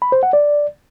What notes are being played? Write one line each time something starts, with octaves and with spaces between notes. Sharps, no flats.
B5
C5
F#5
D5